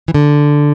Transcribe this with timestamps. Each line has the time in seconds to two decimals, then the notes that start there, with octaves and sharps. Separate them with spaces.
0.08 E3
0.14 D3